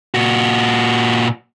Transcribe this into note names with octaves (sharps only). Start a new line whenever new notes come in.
A#2 F#4